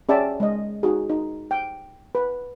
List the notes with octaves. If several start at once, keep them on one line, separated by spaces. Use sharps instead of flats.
C#4 G#4 D5 E5 G5 A5
G#3 D#5
D#4 F#4 G#4
D#4
G5
B4